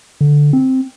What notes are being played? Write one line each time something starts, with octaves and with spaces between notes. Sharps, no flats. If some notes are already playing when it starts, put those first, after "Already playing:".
D3
C4